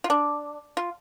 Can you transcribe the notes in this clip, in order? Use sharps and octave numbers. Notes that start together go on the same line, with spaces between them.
F4
D4
F4